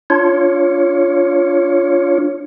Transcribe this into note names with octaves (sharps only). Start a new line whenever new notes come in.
D4 F4 C#5